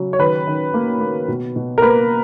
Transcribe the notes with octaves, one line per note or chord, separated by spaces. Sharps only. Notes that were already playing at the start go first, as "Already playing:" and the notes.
Already playing: C#3 F#3
C#5
D#3 B4
D#3
A#3
A#3
B2
B2
A#4
A#3 B4